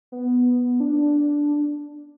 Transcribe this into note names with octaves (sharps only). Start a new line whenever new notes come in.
B3
D4